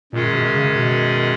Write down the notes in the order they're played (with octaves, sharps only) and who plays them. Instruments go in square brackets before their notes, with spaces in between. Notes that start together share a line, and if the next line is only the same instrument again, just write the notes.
[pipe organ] F#2 D#3 G#3 C#4 G#4 [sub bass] A#2
[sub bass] B2
C#3
B2